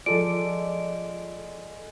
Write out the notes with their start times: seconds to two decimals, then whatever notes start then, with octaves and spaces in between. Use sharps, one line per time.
0.06 F3 G#3 F4 A4 D5 D7